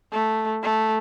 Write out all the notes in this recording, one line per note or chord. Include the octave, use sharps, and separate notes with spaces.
A3
A3